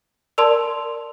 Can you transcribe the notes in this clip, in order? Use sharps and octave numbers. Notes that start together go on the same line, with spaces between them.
A#4 D5 A5 C6 E6